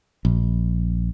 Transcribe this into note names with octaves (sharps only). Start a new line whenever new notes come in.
A#1